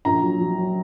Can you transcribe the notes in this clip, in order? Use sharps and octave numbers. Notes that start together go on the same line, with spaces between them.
A#1 A#5
F#3
F#3
F#3